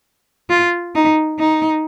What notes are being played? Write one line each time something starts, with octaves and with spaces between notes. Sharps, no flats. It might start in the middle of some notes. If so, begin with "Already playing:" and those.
F4
D#4
D#4